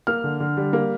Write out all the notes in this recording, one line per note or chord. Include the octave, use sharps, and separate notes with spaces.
A#3 F6
D3
D3
G3
A#3